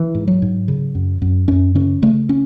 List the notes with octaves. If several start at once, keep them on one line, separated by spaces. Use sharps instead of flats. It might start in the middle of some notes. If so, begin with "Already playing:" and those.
Already playing: E3
G#2
F#3
G#2
C#3
F#2
F#2
F#2 C#4
C#3 C#4
C#3 A3
C#4